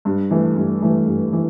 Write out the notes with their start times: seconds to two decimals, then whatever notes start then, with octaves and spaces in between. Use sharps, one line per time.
0.05 G2
0.31 E3 A3
0.56 G2
0.82 E3 A3
1.07 G2
1.33 E3